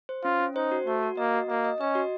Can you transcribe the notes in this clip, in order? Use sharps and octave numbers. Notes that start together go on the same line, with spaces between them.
C5
C#4 F4
C#4
D#4 C5
F#4
A3 F#4
F#4
A#3 D#5
F#4
A#3 D#5
D#5
C#4 D#5
F#4